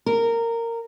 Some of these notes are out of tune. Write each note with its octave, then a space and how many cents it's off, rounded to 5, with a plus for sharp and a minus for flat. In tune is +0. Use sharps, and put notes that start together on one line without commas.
A#4 -15